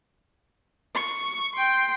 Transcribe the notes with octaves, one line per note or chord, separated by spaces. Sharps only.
C#6
G5 C6